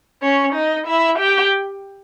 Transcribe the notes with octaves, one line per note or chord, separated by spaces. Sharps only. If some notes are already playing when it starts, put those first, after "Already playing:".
C#4 C#5
D#4 D#5
E4 E5
G4 G5